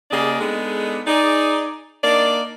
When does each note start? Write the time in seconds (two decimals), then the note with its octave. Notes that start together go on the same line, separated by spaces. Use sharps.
0.11 C#3 A#3 G4 G#4 D5 D#5
0.41 G#3 B3 D4 D#4 G#4 A4
1.07 D#4 G#4 D5
2.04 A#3 D4 D#4 D5